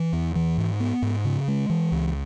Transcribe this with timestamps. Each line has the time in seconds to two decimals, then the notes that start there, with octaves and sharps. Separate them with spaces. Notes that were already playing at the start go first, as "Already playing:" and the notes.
Already playing: E3
0.13 E2
0.35 E3
0.58 G#2
0.80 B3
1.02 G#2
1.25 C#3
1.48 G#3
1.70 E3
1.92 C#2